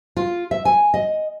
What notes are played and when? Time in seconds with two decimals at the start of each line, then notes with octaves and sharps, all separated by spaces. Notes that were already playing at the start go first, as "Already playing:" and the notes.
0.17 F4
0.51 E5
0.65 G#5
0.94 D#5